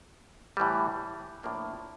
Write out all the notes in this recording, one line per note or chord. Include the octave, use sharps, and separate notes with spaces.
A2 E3 G3
A2 F3 A#3 D4